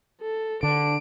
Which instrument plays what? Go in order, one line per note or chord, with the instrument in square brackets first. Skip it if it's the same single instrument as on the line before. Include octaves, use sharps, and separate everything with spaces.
[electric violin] A4
[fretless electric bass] D3 [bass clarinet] D4 [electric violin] D7